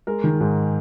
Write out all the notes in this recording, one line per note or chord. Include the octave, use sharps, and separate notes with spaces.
G#3 A#4
D#3
G#2